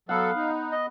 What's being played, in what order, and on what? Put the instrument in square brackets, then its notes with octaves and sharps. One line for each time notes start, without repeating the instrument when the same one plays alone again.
[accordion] F#3 A4 [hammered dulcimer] B3 F#5 [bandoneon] F5
[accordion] D#4
[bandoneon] D#5